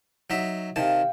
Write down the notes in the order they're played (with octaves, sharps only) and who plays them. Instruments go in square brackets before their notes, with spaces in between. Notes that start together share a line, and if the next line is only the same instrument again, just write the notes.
[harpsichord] F#3 D#4 E5
[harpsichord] C3 D#3 A5 [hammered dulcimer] F5 G5